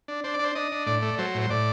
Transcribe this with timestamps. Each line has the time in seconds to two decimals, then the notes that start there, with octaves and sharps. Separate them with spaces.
0.08 D4
0.24 D4 C5
0.34 D5
0.39 D4 C5
0.55 D4 D#5
0.72 D4
0.86 A2 D5
1.02 A3
1.18 F#3 C5
1.34 A2
1.41 C5
1.50 A2 D5